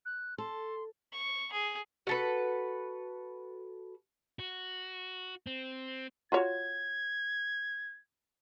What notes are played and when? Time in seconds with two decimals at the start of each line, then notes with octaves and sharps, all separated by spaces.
0.05 F#6
0.38 A4 C6
1.12 C#6
1.52 G#4
2.07 F#4 A4 B4
4.39 F#4
5.47 C4
6.32 F4 F#4 C#5 G#6